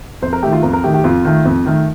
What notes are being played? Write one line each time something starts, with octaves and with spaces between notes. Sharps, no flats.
F2 C5
A#4
D#3 A3 G4
F4
F2 A#4
A#4
D#3 A3 G4
G4
F2 F4
D#3 A3
F2
D#3 A3